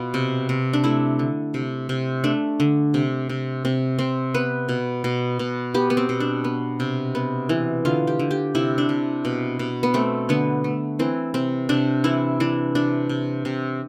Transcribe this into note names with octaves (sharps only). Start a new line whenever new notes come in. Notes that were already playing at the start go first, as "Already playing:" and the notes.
Already playing: B2 F4
C3
C3
D4
A3 E4
D3
C3
C3
A3 D4
D3
C3
C3
C3 C4
C3 C4
B3 B4
B2
B2
B2
B3 G4
B3
C4
B2
D4
B3
C3
B3
E3
D3 F4
G4
D3
G4
C3 E4
D4
C3
B2
B2
B3
A3 C4
D3 B3
A3
E3 C4
C3 C4
C3 D4
E3 E4
E3 D4
C3 D4
C3
C3